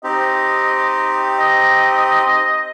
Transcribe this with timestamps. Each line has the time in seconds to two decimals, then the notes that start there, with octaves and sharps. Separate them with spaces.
0.04 C4 D#4 G4 D#5
1.39 D#5